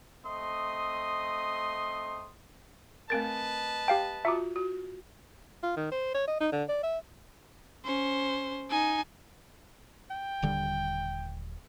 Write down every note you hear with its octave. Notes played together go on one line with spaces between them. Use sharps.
A3 C4 D#5 C6 D#6
A3 C4 A#4 B4 D#5 A5 A6 D7
G4 F5 G5
F4 F#4 E5 A#5 D6
F#4
F4
D#3
C5
C#5
D#5
D#4
D3
D5
E5
C#4 C5
D#4 G#5
G5
D#1 D3 G3